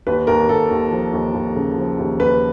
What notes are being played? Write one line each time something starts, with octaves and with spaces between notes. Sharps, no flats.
D#2 B4
D#2 A#4
D#2 A4
D#2
F3
D#2
D#2
C#3
F3
D#2
D#2 B4